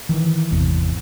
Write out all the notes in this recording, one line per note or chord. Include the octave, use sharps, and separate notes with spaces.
D#3 E3
G#1 E2 C3